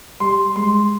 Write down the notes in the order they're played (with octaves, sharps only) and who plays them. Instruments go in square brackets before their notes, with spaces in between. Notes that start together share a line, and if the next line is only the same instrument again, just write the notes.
[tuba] G3 [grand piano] C6
[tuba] G#3 [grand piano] C6